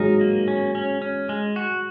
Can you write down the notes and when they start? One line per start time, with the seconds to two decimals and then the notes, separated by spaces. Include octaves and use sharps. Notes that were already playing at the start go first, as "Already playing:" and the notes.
Already playing: F#3 G#3 D#4 A#4
0.21 A#3
0.48 C#4
0.75 C#4
1.02 C#4
1.29 G#3
1.56 F#4